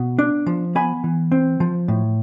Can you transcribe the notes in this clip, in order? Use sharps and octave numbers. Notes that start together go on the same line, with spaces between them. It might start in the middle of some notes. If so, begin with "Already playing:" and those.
Already playing: B2 B3
D4
F3
B3 G#5 B5
E3
C4
F3
A2